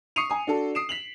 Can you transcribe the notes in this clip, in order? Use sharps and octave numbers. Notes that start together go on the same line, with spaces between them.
C#6 D#6 C7 C#7 D#7 F7
G#5 D#6
D4 F#4 A4
D#6 C7 D7 E7
B6 F7 F#7